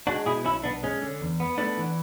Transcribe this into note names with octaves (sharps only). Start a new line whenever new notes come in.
G#3 D4 F#4
B2 E4 G#4
B1 C#4 E4
B1 B3 D4
G#3 C#4
D3
E2
B3
A3 B3 D4
E3